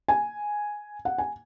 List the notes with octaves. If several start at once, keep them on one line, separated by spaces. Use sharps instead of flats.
G#5
F#5
G#5